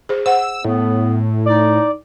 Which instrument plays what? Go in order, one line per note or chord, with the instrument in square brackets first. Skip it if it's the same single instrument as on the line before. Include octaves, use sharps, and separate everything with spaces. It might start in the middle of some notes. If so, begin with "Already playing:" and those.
[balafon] G#4 C5
[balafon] C5 F#5 [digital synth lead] E6
[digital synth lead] A2 [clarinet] B3
[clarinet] D#4 [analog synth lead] D5